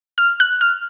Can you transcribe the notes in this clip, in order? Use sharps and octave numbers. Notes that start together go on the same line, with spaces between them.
F6
F#6
F6